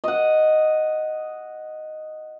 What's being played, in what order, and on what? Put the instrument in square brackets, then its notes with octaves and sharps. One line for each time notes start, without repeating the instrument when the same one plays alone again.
[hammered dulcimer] D#5 F#5